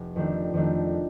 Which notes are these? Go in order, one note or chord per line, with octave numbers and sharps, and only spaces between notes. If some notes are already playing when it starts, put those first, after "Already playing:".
Already playing: F1
F2 D#3 A3 D4
F2 D#3 A3 D4